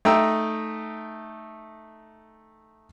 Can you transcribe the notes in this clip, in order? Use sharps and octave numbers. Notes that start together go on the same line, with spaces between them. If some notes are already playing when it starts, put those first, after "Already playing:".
A3 D#4 G5 A#5 E6